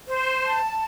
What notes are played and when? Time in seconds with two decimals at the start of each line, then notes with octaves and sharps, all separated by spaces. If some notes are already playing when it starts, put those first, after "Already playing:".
0.08 C5
0.45 A5